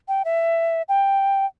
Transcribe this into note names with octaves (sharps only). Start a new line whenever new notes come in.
G5
E5
G5